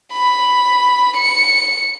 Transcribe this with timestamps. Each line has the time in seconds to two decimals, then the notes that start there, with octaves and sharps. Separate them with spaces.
0.12 B5
1.17 C#7